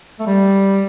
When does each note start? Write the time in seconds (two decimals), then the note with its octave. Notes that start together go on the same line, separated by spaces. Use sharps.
0.20 A3
0.27 G3